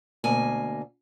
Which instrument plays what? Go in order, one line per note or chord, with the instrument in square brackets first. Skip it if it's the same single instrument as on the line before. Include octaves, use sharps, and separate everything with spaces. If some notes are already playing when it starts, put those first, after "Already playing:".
[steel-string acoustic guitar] D2 B2 A#3 G#5